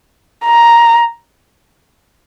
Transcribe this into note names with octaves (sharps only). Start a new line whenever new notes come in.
A#5